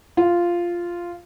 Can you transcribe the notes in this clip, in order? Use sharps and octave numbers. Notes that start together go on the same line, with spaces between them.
F4